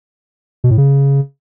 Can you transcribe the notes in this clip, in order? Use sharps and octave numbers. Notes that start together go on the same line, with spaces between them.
B2
A2
C#3